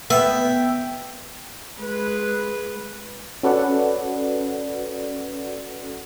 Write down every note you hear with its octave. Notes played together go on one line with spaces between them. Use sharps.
B3 E5 G5
G#3 B4
C#4 F#4 A4 B4 D5 F#5